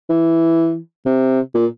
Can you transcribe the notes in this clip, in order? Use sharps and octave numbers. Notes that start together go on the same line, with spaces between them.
E3
C3
A#2